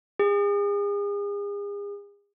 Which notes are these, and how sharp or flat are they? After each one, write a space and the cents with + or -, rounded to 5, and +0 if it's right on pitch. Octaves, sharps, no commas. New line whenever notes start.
G#4 -40